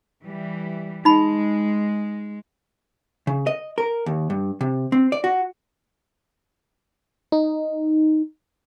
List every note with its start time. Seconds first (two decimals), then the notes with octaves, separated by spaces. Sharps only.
0.22 E3 G3
1.05 G#3 D#4 B5
3.27 C#3
3.47 D#5
3.78 A#4
4.06 D#2
4.30 G2
4.61 C3
4.92 C4
5.12 D5
5.24 F#4
7.32 D#4